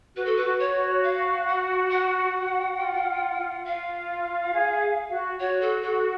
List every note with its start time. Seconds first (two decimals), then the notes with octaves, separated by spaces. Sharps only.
0.16 F#4 B4
0.26 A4
0.37 B4
0.44 F#4
0.59 C#5
0.75 F#4
1.03 F5
1.47 F#5
1.90 F#5
2.77 F4
3.06 F4
3.36 F4
3.65 F4 F5
4.52 G#4
5.11 F#4
5.39 F#4 C#5
5.61 A4
5.83 A4